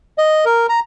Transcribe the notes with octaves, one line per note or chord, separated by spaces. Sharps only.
D#5
A#4
A#5